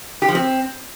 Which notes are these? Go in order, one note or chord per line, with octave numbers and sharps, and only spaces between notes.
G4
F3
C4